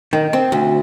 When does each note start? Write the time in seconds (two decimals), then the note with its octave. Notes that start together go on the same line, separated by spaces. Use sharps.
0.13 D#3
0.33 C4
0.52 D2